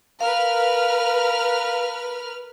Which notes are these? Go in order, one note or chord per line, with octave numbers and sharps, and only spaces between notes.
A#4 B4 F5 F6